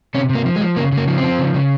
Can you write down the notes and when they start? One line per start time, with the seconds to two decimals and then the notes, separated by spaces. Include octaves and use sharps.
0.14 C3 C#4
0.29 C3
0.35 A#3
0.45 F3
0.56 G#3
0.61 F3
0.76 C#3 A#3
0.92 C#3
0.97 A#3
1.08 F3
1.18 C4
1.23 F3
1.39 C#3
1.54 C#3